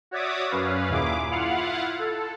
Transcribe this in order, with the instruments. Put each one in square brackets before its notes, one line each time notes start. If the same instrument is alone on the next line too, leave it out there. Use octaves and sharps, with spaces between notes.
[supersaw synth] F#4 C#5 D5 E5 D6 D#6
F#2 C#4 B4 F5
D#2 A#2 E4 G#4 D6
E4 F4 F5 F#5
A4